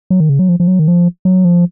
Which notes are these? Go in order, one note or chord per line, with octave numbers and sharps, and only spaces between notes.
F#3
D#3
C#3
F#3
F3
F3
F#3
D#3
F3
F#3
F3